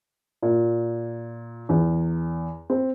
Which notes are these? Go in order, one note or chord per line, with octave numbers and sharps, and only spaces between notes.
A#2
E2
C4